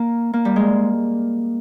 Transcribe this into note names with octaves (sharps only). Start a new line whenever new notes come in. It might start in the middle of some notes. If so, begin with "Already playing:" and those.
Already playing: A#3
A#3
G3
G#3